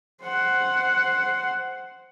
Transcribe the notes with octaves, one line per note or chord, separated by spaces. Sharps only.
C5 F#5